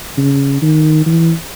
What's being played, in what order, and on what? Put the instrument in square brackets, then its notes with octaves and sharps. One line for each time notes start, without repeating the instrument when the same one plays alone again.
[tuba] C#3
D#3
E3